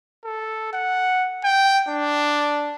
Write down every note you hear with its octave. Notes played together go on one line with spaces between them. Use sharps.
A4
F#5
G5
D4